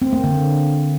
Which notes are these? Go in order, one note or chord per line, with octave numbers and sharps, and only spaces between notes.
C4
A#3
D3